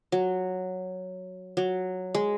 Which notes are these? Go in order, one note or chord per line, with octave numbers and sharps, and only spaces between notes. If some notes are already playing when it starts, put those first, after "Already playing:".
F#3
F#3
G#3